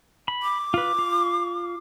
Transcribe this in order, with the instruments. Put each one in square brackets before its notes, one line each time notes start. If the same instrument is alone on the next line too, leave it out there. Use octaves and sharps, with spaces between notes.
[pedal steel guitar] B5
[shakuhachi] D6
[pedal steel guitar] F4 B4
F4